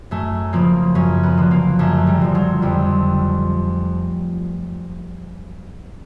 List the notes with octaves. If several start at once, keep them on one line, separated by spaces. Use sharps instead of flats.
F#2 A3
C#3 F3 A#3
F#2 C#4
B3
D3 F3
A#3
F#2 A3
G3
D3 F3
F#3
F2 G3